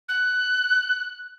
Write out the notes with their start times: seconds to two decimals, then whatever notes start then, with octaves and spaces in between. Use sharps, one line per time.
0.08 F#6